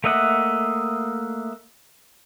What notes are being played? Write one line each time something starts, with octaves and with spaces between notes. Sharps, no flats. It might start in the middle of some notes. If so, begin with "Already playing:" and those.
A3 A#3 D#5 E5 F#5